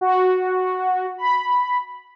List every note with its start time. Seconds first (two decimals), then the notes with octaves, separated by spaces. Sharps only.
0.01 F#4
1.18 B5